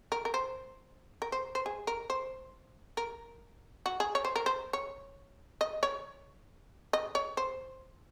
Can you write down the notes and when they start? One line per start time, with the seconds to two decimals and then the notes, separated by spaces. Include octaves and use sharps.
0.12 A#4
0.25 A#4
0.34 C5
1.22 A#4
1.32 C5
1.55 C5
1.66 G#4
1.87 A#4
2.10 C5
2.97 A#4
3.86 F#4
4.00 G#4
4.15 C#5
4.25 C5
4.36 A#4
4.46 C5
4.73 C#5
5.61 D#5
5.83 C#5
6.93 D#5
7.15 C#5
7.37 C5